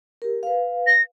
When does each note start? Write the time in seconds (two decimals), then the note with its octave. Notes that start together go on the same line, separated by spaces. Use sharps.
0.22 G4 A#4
0.43 B4 F5
0.87 A#6